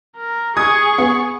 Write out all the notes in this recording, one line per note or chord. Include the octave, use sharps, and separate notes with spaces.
A#4
G#4 C#6 D#6 G#6
B3